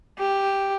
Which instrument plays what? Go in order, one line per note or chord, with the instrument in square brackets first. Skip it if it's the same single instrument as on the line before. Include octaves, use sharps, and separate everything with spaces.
[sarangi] G4